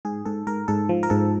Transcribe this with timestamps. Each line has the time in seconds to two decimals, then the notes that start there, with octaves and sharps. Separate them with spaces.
0.05 G#2 G#4
0.26 G#2 A4
0.47 G#2 A#4
0.68 G#2 A4
0.89 F3
1.03 A#4
1.10 G#2 A4